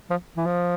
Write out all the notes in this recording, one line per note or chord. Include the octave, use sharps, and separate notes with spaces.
F3
E3
F3